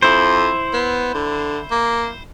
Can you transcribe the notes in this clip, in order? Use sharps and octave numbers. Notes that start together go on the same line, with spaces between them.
F2 E4 C5
B3
D3
A#3